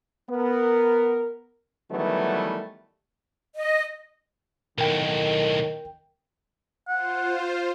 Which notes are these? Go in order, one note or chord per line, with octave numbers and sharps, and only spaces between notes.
B3 A#4
D#3 E3 F#3 G3 A3 B3
D#5
B1 A2 D#3 A#4 G5
F4 C5 F#5